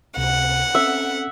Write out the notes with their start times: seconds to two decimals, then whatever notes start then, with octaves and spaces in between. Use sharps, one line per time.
0.17 C#2 C3 F#5
0.75 C4 C#4 A4 E5